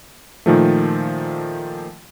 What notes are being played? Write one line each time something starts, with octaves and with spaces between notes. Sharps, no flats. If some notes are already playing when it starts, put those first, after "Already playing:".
A#2 D#3 F3 A3